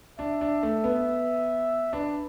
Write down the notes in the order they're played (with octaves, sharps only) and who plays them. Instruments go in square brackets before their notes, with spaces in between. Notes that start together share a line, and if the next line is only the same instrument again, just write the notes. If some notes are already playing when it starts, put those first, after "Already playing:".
[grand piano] D4 [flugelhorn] E5
[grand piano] D4
A3
B3
[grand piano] D4 [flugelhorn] B4